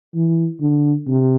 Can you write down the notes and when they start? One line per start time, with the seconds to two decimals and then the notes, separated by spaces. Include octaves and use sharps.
0.15 E3
0.61 D3
1.07 C3